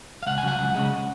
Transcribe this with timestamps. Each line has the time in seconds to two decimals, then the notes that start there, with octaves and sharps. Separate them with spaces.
0.23 F5
0.27 C#2 F#5
0.38 G#5
0.43 C#3 F#3 F#5
0.59 C#2
0.75 C#3 G#3